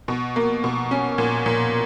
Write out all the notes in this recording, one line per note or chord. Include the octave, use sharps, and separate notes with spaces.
B2
A#3
B2
C#4
A#2
A#2